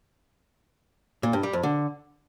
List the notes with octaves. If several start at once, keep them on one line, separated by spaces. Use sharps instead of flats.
A#2
G2
G3
F2
D3